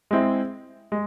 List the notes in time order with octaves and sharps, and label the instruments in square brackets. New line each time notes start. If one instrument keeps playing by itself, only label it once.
[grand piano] G#3 C4 E4
G#3